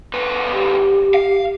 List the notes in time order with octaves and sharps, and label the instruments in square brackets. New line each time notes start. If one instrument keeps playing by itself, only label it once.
[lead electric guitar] D2 B4
[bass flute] G4
[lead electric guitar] F5